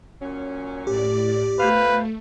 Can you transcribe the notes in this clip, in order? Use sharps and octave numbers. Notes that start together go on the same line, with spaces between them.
A#2 F#3 C#4
A2 G4 D5
B2 A3 B4 C5 F5